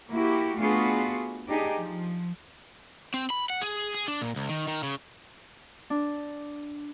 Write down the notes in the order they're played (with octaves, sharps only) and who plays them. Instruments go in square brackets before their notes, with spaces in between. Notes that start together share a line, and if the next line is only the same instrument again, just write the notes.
[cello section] A#3 E4 F#4 G4
A3 B3 D4 F4 F#4 G#4
D4 D#4 G4 G#4
F3
[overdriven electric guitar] C4
B5
F#5
G#4
G#4
D4
A#2
C#2
D#3
D#3
C#3
[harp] D4